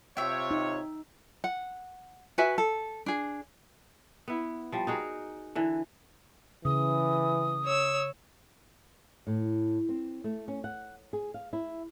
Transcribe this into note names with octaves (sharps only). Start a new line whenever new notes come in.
C3 F4 C#5 E5 G5
D#4
F#5
F#4 B4 E5 G#5
A4
D4 G#4
B3 E4
F3 G3
D#4 F#4 G#4 A#4
D3 E3
C#3 E3 D#6
C#5 E6
A2
C4
A3
C#4
F#5
G#4
F5
E4